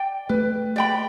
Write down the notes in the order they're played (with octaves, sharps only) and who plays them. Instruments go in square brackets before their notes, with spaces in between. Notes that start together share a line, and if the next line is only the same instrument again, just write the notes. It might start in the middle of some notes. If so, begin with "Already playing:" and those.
Already playing: [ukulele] D5 G5
[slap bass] A3 [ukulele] B4
[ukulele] D5 G5 B5